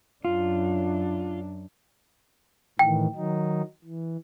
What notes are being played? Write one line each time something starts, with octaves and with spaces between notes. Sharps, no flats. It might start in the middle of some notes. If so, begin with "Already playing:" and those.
F#2 D4 F4
A2 D#3 E3 G5
D#3 F#3 D#4
E3